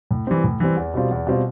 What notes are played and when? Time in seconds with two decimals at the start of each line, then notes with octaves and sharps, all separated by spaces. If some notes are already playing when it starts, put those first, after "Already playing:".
0.11 A2
0.27 E3 G3 C4
0.44 A2
0.60 E3 G3 C4
0.77 E2
0.94 B2 G3 C4 F4
1.11 E2
1.27 B2 G3 C4 F4